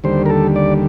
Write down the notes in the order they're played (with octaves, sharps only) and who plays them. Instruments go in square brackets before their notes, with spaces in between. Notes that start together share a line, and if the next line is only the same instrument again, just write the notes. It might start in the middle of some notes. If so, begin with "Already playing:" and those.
[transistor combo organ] D#2 D3 G3 C5
A#4
A4
D5